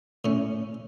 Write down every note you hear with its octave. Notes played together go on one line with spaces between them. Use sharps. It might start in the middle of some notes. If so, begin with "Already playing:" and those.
A2 C#4